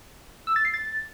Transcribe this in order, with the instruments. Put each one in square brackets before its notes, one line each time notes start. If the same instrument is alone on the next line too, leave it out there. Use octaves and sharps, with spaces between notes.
[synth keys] E6
A6
C7
A6